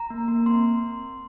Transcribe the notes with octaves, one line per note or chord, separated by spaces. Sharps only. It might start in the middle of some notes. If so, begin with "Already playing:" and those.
Already playing: A#5
A#3
A#3
C4 C6